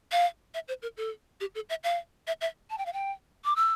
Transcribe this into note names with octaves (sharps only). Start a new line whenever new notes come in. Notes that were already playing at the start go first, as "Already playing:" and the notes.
F5
E5
C5
A#4
A4
G4
A4
E5
F5
E5
E5
A5
G5
F5
G5
D6
E6